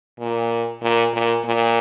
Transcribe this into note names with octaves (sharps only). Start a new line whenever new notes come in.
A#2
A#2
A#2
A#2